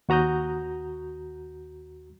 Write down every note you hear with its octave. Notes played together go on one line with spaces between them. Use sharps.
D#2 F#4 A#5 D#6 G6